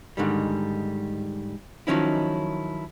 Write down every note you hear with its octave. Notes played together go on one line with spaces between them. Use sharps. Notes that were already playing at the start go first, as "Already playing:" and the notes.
G#2 D3 D#3 G3
D#3 F3 F#3 C#4 D#4 E4